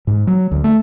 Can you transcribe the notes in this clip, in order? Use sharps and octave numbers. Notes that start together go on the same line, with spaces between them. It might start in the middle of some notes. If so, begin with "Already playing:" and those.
G#2
F#3
D2
A3